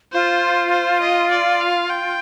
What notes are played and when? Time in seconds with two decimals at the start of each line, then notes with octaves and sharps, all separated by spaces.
0.13 F4 C5
0.72 C5
1.01 D#5
1.31 D5
1.61 F5
1.90 G5